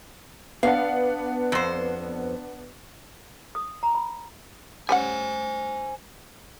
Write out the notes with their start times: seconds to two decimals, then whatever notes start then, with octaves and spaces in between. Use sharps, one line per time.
0.63 B3 D4 F5 F#5
1.52 F2 C5
3.55 D#6
3.83 A#5
3.95 B5
4.89 G3 C#4 C5 F#5 G#5